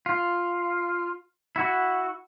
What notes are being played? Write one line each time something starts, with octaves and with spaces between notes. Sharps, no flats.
F4
E4 F#4